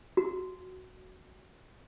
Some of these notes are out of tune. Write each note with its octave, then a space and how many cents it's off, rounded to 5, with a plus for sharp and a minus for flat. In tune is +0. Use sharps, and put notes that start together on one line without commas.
F#4 +0